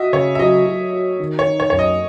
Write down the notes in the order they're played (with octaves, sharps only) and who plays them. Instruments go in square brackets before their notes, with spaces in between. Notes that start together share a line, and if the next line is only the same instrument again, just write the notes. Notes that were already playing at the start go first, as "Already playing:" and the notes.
Already playing: [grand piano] F#4 [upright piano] D#5 E5
[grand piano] C#3 [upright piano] C#5
[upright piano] E5
[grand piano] F#3 [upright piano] D#5
[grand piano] F#3
F#4
D#3
[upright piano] C#5
[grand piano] D#4
[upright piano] C#5
[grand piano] F#2 [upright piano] C#5
[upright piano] D#5